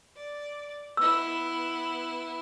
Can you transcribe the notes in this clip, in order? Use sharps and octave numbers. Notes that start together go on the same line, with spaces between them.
D5
B3 E4 E6